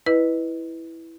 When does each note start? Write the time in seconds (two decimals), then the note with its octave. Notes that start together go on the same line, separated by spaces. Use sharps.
0.06 E4 B4 D#5